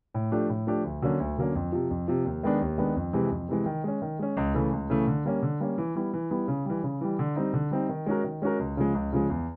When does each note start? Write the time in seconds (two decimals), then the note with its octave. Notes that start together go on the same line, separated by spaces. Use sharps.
0.14 A2
0.32 F3 A3 D4 G4
0.49 A2
0.67 F3 A3 D4 G4
0.84 D2
1.02 D3 F#3 A#3 C#4
1.20 D2
1.37 D3 F#3 A#3 C#4
1.55 F2
1.72 C3 F3
1.90 F2
2.08 C3 F3
2.25 D#2
2.43 D#3 G#3 B3 D4
2.61 D#2
2.78 D#3 G#3 B3 D4
2.96 F2
3.13 C3 E3 G#3
3.31 F2
3.49 C3 E3 G#3
3.66 D#3
3.84 G#3 C#4
4.02 D#3
4.19 G#3 C#4
4.37 C#2
4.54 C#3 E3 A3
4.72 C#2
4.90 C#3 E3 A3
5.07 D3
5.25 G3 A#3 C#4
5.43 D3
5.60 G3 A#3 C#4
5.78 E3
5.95 G3 B3 E4
6.14 E3
6.31 G3 B3 E4
6.48 C#3
6.65 E3 G3
6.83 C#3
7.01 E3 G3
7.19 D3
7.36 G3 C4 D#4
7.54 D3
7.71 G3 C4 D#4
7.89 D#3
8.06 G#3 C#4 F#4 A#4
8.24 D#3
8.42 G#3 C#4 F#4 A#4
8.59 C#2
8.77 C#3 F3 G#3
8.94 C#2
9.13 C#3 F3 G#3
9.30 E2